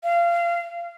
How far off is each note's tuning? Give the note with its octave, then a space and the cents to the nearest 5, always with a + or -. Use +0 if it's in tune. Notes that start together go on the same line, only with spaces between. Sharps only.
F5 -25